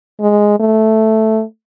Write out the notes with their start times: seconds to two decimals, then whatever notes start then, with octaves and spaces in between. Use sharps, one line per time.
0.20 G#3
0.60 A3